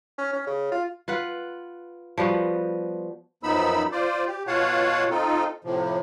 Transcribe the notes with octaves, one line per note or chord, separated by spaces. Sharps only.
C#4
C#4
C#3
F4
F4 B4 F#5
F3 G3 B3 F#4
F#2 F3 B3 D#4 B5 E6
F4 C5 D5
G4
B2 F4 C#5 F5 F#5 A5
C4 D#4 F4 A4
A2 C3 F3